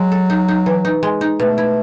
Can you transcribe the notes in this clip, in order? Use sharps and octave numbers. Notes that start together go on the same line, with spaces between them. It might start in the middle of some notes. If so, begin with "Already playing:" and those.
Already playing: F#3 G#3
A4
D#4
D#4
E3
D#4
G#3
D#4
B2 A3
E4